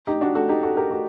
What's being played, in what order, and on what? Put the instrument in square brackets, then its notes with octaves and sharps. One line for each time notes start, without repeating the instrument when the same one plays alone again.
[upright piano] D#4 G4
D4 F#4
F#4 A4
D#4 G4
F#4 A4
G4 A#4
F#4 A4